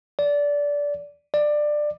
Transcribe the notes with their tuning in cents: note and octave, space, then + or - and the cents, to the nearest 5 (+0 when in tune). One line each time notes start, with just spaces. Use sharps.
D5 -20
D5 +15